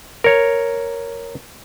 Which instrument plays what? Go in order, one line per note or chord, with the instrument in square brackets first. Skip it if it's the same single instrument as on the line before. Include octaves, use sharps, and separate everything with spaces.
[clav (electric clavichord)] A#4 C#5